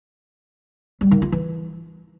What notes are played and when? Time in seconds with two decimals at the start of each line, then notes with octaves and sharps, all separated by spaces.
1.01 G3
1.11 D#3
1.22 F4
1.32 E3